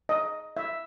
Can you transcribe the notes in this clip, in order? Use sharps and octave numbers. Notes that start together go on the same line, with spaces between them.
D#5
E5